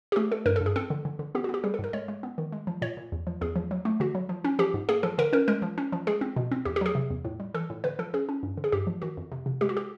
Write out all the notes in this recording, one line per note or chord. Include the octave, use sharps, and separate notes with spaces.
G4
A3 G#4
A3 A4
G2 A#4
A4
G2
G#4
C4 A4
D3
D3
D3
B3 G4
F#4
B3
G4
G3 G#4
A4
G#2 A#4
G#3 C#5
G#3
B3
D#3
G#3
F3
A#2 C#5
A#2
E2
F3
E2 G#4
F3
F#3
A3
D3 F#4
F#3
F3
C#4
F3 G4
G#2
A#3 G#4
F3 A4
D3 A#4
C#4 A#4
G#3 A#4
F3
C#4
F3
G#3 G#4
C4
B2
C4
E2 G4
G4
F#3 G#4
C3
E2
A2
G3
E3 A4
A2
D3 B4
F3 A4
C#4 G#4
C#4
G2
D3
G#4
G2 G4
F3
D#3 F#4
F2
C3
C3
G#3 G4
F#4
G4